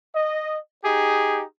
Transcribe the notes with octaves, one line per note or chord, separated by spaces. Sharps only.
D#5
D#4 G4 G#4